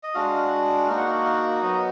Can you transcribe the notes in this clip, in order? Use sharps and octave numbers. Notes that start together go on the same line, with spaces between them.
D#5
G#3 D4 F#4 F5
A#3 D#4 F#4 F5
F#5
F5
F5
F#3 B3 D#4 D#5